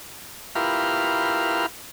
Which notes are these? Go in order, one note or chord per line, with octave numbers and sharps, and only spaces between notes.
E4 F4 G4 A#4 B4 F5